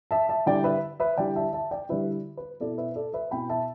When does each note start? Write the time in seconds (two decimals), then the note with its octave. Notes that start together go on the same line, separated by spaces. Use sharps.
0.11 E5 A5
0.29 E5 A5
0.46 D3 G3 E4 D5 G5
0.64 B4 E5
1.00 B4 E5
1.17 D3 G3 E4 D5 G5
1.36 E5 A5
1.53 E5 A5
1.71 D5 G5
1.89 D3 G3 E4 B4 E5
2.37 B4
2.60 B2 B3 E4 A4 D5
2.78 B4 E5
2.96 A4 D5
3.14 B4 E5
3.31 B2 B3 E4 G5 B5
3.50 E5 A5